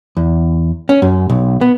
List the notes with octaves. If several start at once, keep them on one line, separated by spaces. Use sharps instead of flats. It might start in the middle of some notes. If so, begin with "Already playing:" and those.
E2
C#4
F#2
B1
B3